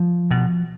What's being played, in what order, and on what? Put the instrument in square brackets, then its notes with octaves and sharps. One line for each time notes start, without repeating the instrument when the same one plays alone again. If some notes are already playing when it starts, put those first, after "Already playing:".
Already playing: [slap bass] F3
B2